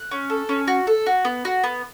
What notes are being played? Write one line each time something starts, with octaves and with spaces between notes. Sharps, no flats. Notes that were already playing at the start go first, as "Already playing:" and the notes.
Already playing: F#6
C#4
A4
C#4
F#4
A4
F#4
B3
F#4
B3